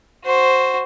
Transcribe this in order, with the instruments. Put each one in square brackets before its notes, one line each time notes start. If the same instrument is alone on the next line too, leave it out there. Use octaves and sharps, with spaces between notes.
[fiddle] F#4 C5